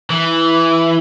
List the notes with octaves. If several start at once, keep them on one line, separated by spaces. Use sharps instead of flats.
E3